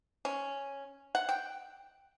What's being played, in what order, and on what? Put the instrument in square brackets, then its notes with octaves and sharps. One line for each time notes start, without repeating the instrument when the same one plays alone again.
[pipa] C#4
F#5
G5